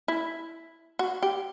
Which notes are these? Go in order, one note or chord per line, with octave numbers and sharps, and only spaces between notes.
E4
F#4
G4